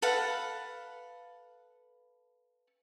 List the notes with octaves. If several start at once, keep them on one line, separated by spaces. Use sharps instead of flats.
A4 B4 F5 F#5